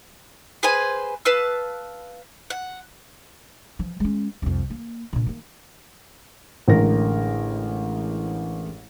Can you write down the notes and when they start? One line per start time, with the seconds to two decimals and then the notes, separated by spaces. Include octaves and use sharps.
0.63 G#4 B4 C5 G#5
1.25 B4 F5 A5 E6
2.50 F#5
3.79 E3 F3
4.00 G#3 C#4
4.42 C2 F2
4.70 A#3
5.13 A#2 D3
5.26 D#3 A#3
6.68 A1 A2 D3 G#3 A#4 A#6